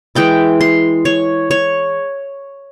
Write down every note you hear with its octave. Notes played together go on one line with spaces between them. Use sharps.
E3 G#3 E4 G5
C6
C#5
C#5